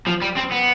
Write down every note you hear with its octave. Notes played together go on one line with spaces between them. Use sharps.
F3
G3
C4
B3